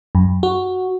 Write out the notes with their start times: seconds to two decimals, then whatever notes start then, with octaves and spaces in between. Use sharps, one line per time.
0.15 F#2
0.43 F#4